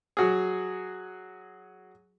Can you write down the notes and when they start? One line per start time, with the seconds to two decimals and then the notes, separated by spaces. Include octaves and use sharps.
0.17 F#3 F#4 G#4